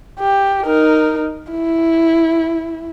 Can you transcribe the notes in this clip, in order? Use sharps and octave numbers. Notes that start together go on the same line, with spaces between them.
G4
D#4 A#4
E4